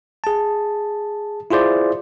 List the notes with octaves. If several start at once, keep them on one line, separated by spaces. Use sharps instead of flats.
G#4 A5
E4 F4 G#4 C5 D5